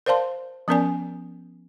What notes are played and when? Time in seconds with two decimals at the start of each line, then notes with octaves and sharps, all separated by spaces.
0.06 A#4 C5 D5 F5 A5 C6
0.68 F3 B3 C#4 A#4 D5 G#5